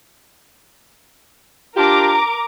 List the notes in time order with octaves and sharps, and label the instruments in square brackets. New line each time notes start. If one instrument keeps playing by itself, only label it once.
[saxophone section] D4 F4 G4 [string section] A#4 A#5 D6